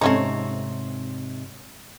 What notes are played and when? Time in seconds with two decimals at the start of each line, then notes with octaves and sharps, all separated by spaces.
0.01 G#2 C3 A3 C4 C#4 D#4 C#5